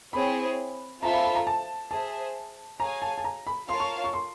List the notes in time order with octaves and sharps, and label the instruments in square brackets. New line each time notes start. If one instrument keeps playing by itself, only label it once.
[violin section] C4 E4 G#4 C#5 [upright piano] B5
[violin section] C4 F4 A4 C5 E5 [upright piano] A#5
[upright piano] B5
B5
A#5
A5
[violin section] G#4 C5 E5 [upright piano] A5
[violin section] G#4 C#5 F5 G#5 [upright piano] A#5
[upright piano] A5
A5
A#5
B5
[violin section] F4 A#4 C#5 F5 A5 [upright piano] C6
[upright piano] C#6
C#6
C6